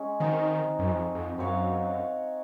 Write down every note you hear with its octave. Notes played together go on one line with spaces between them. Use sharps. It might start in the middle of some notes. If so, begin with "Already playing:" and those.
Already playing: G#3 C#4 G#4
D#3 C4 D#4 F#4
F#2
F2
F2
F#2 C4 F#4 C#5 F5